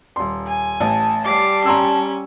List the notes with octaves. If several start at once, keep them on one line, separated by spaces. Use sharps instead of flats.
D#1 C6
G#5
A1 A5
G3 D6 C7
C#4 A#5 C6 E6